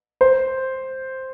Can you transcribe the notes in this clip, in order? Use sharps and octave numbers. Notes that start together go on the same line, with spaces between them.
C5